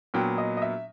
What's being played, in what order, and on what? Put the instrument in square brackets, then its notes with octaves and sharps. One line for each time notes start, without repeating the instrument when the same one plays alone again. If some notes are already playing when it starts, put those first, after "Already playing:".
[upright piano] A#2 F#3 B3 G5
D#5
D#5
E5